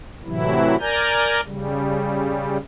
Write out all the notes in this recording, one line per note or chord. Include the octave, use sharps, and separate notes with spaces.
A2 C3 E3 F#3 E4
A#4 D5 G#5 A#5 G6
C#3 G3